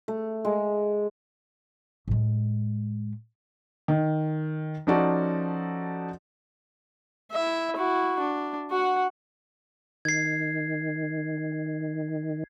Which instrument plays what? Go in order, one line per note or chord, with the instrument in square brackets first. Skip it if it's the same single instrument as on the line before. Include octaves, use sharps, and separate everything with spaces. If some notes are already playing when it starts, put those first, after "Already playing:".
[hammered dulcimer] A3
G#3
[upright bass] A2 G#3
[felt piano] D#3
F3 C#4 D#4 F#4 A4 D5
[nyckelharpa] E4 E5
E4 F#4
D4
F#4 F#5
[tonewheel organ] D#3 [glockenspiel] G#6 C7